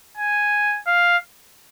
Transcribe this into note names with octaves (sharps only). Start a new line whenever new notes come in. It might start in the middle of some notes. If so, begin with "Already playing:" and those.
G#5
F5